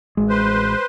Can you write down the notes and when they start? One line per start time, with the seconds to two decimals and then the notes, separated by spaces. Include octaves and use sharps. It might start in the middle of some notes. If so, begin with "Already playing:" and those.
0.17 A1 G#3
0.29 B4 C5